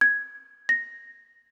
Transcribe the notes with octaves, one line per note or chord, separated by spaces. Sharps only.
G#6
A#6